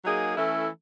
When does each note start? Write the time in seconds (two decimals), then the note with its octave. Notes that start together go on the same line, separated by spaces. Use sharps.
0.04 F#3 A#3 D#4 G#4
0.36 E3 A3 C#4 E4 A4